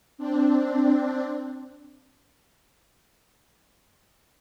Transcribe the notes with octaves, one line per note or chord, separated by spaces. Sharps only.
C4 D4